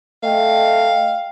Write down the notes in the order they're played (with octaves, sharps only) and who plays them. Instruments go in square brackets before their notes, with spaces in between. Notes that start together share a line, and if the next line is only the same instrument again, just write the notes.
[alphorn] A3 [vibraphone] D#5 G5 [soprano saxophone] F5